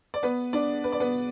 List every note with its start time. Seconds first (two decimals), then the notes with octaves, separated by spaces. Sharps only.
0.14 D5
0.23 B3 B4
0.53 D4 D5
0.84 B4
0.92 D5
1.00 B3 B4